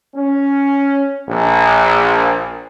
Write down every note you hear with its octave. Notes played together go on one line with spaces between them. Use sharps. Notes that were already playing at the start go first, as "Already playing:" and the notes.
C#4
A#1